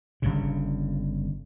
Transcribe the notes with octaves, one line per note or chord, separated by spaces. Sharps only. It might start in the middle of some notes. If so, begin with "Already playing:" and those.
G1 G2 C#3